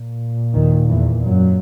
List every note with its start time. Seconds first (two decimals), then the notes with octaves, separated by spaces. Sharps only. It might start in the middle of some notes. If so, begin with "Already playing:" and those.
Already playing: A#2
0.54 D#2 D#3
0.89 E2 E3
1.24 F#2 F#3